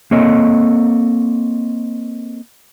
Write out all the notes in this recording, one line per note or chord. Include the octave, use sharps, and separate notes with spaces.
A#3 C4 A4 C#5 D#5